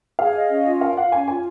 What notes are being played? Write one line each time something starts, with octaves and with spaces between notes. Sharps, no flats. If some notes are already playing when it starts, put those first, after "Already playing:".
G#4 F5
D#5
C#4
F4
A#4 F5
F5 F#5
C#4 G#5
F4 G#5